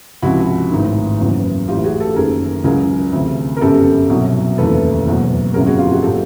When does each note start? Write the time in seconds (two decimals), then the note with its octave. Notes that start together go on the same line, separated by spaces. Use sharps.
0.22 C#2 C3 F3 E4 F#4
0.71 A1 G#2 D#3
1.20 F#1 E2 C#3 F#3
1.68 A1 A2 E3 F4 G4
1.84 F#4 G#4
2.00 G4 A4
2.16 F#1 F#2 D#3 G#4 A#4
2.64 C#2 C#3 F#3 G#4 A#4
3.13 D2 C3 E3
3.57 A#4
3.61 G1 F#2 C#3 G4 A4
4.09 C2 B2 F#3
4.58 F1 D#2 C#3 E3 A4 B4
5.06 F#1 E2 B2 F#3
5.54 G1 F2 C#3 F#3 G#4 A#4
5.66 F#4 G#4
5.79 F4 G4
5.91 F#4 G#4
6.02 A#2 F#3 G4 A4